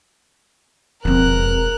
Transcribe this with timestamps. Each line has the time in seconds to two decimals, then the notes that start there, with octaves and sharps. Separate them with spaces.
1.05 E1 F2 C4 A#4 F#6